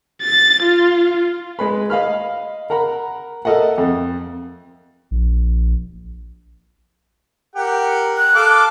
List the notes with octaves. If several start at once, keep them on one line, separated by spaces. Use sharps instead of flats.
A6
F4
G#3 B4 B5
D#5 F5 B5 F6
A#4 F#5 A#5 B5
A4 A#4 D#5 E5 F#5
F2
A#1
G4 A#4 F#5
F#6
A4 F5 D6